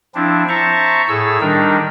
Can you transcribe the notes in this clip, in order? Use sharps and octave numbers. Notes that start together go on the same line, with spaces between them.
F3 C4 D4 E4
C5 E5 A5 A#5 C#6
A2 G#4 A4 E6
D#3 G3 D4 D#4 A#4